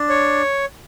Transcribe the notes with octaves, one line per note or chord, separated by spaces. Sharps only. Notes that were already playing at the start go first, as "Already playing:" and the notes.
Already playing: D4
C#5